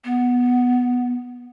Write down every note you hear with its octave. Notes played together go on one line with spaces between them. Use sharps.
B3